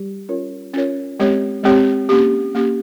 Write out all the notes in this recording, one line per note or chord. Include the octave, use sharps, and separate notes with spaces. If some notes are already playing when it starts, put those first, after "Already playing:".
Already playing: G3 G4
C#4 F4 A#4 C#5
C#4 F4 A#4 C#5
G#3 C4 G4 C#5
G#3 C4 G4 C#5
A#3 C#4 G4
A#3 C#4 G4